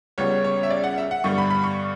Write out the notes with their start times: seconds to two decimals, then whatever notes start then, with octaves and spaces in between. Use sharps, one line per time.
0.18 C#2 C#3 G3 B3 C#5
0.44 C#5
0.63 E5
0.70 D5
0.84 F#5
0.98 E5
1.11 F#5
1.24 G2 D3 G3 B3 C#6
1.38 B5
1.50 B5
1.64 C#6